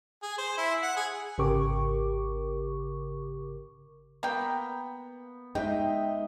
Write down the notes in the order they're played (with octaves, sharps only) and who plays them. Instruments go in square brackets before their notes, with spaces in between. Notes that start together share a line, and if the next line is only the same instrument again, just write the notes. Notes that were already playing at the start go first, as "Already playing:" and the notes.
[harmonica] G#4
C5
E4
F#5
G#4
[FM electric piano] G#1 C#3 G4 A#4 C#6 D6
[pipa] A#3 G5 [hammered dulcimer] B3
[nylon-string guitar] G#3 D#4 [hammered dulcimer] D#5 E5 [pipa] G5